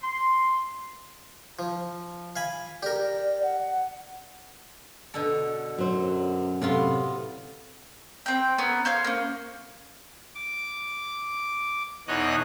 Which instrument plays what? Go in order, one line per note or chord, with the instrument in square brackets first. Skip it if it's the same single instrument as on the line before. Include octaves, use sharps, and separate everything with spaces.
[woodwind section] C6
[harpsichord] F3
F5 G#5 B5
[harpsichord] G4 A#4 [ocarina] D5
[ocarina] F#5
[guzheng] B2 D3 A4
[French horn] F#2 [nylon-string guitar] F#3 C5
[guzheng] A2 B3 F4 [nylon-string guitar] C3
[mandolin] C4 G5
B3 C#4 A#4
C5 C#5 F5 F6
A#3 C#4
[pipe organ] D6
E2 B2 D#4 C#5 D#5 F#6